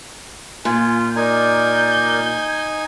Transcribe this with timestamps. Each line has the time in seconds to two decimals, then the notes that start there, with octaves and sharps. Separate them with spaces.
0.65 A#2 F4 G#5
1.16 D#4 A#4 D5 G#5 G6